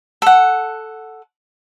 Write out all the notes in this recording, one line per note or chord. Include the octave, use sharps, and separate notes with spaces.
A4 F#5